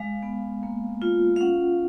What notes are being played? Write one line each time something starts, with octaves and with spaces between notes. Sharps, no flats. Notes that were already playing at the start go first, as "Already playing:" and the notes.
Already playing: G#3 F5
B3
A#3
F4
F5
C#4 F#5